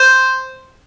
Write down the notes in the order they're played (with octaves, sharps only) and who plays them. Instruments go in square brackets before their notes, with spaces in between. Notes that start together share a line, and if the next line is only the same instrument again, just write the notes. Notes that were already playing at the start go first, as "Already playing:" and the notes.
Already playing: [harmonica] C5